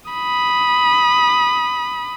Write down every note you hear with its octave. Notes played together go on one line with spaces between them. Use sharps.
B5 D#6